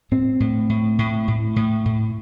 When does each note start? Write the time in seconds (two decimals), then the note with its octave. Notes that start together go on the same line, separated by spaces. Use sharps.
0.12 A2 C4
0.40 A2
0.70 A2
0.99 A2
1.28 A2
1.56 A2
1.86 A2